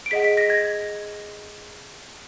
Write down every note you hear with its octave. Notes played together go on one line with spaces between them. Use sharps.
D7
G#4 D#5 F#5 B6
B6
A#6
G#6